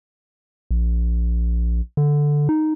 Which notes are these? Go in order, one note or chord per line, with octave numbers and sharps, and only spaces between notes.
A#1
D3
D#4